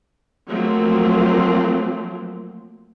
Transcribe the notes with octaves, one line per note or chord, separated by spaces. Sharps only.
F3 F#3 A3 A#3 C4